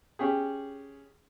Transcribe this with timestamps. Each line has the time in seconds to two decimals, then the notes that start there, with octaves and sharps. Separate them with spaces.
0.19 C#4 G4 G#4